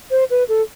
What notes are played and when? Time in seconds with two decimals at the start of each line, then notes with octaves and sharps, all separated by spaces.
0.11 C5
0.31 B4
0.49 A4